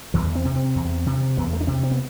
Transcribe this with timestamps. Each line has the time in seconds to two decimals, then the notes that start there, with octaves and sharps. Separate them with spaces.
0.14 E2 E3
0.35 C4
0.45 C3
0.56 C4
0.76 E2
1.06 C3
1.37 E2 B3
1.53 A3
1.61 D4
1.67 C3 C4
1.83 C4
1.91 B3